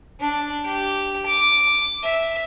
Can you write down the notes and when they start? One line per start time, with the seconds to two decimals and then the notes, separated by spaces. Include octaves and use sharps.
0.21 D4
0.65 G4
1.26 D6
2.03 E5